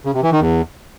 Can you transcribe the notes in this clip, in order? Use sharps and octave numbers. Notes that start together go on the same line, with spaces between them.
C#3
C3
E3
D#3
E2